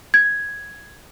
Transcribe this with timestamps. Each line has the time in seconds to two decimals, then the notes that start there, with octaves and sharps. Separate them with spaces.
0.14 G#6